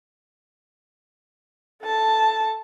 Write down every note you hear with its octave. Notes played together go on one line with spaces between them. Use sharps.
A4 A5